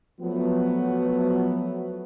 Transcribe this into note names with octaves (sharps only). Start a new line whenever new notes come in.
F3 F#3 A3 B3